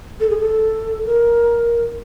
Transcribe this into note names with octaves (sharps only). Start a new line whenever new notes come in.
A4
G#4
A4
A#4